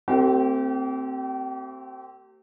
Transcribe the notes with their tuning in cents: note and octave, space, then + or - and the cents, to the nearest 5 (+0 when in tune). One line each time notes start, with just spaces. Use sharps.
A3 +40 C4 +0 G4 -40